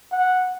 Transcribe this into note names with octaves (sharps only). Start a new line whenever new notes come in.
F#5